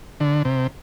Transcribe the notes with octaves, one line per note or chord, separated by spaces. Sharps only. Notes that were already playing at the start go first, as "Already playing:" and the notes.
D3
C3